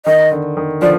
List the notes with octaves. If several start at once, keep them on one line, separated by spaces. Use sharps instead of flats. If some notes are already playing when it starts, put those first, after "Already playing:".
D#3 D#5
D3
D#3
D3 F3 D5